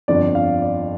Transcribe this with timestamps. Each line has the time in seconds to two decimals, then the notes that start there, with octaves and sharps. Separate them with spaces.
0.08 G1 F2 F3 D4 D5
0.35 F5
0.62 D5